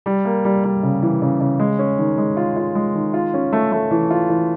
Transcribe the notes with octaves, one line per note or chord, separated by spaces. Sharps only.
G3
A#3
G3
G3
C#3
E3
C#3
C#3
G#3
C#4
D#3
G#3
F4
F4
G#3
D#3
F4
C#4
A3
A3
E3
F4
E3